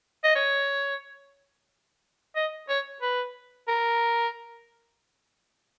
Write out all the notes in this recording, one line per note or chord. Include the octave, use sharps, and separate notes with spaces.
D#5
C#5
D#5
C#5
B4
A#4